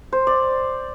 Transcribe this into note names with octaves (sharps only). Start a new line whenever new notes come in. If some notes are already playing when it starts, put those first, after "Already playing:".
C5
D5